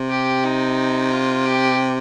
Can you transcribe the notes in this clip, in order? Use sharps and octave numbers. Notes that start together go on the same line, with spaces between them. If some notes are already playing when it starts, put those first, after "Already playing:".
Already playing: C3
G4
D#4
F4
G4